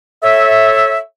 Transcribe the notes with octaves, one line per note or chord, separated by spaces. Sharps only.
A4 C#5 E5